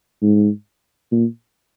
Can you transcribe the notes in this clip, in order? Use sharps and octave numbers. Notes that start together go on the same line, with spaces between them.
G#2
A#2